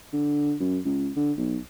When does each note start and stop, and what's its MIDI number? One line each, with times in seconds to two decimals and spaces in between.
0.13 0.54 50
0.60 0.79 42
0.85 1.10 37
1.16 1.32 50
1.38 1.58 35